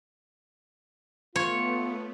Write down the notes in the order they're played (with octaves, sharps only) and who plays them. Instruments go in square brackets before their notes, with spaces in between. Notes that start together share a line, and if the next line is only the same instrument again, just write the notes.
[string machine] A3 B3 [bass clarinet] F4 [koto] C#5